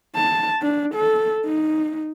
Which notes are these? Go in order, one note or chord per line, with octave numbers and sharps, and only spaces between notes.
A5
D4
A4
D#4